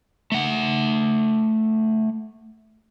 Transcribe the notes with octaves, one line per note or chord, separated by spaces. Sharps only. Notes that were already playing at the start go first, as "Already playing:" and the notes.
A3 F#5